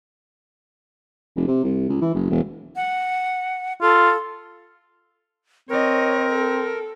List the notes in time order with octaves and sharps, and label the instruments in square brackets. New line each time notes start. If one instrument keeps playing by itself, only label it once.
[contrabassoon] F1
C3
C2
C#2
E3
F#1
E1
[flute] F#5
[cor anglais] F4 [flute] A4
[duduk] C4 [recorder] A#4 [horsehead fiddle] C#5 D#5
[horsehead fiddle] A4